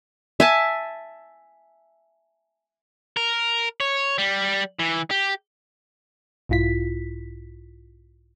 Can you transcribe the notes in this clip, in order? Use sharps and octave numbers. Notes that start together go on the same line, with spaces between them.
E5 G#5 A5
A#4
C#5
G3
E3
G4
B1 G#2 E4 F4 B6